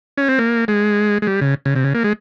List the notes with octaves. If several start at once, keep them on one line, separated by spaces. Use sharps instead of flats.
C#4
C4
A#3
G#3
G#3
G3
C#3
C#3
C3
C#3
A#3
G#3